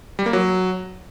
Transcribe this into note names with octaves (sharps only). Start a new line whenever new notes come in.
G3
A#3
F#3